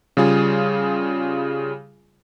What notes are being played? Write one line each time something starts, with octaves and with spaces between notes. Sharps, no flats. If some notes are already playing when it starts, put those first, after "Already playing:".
C#3 G3 F4 G#4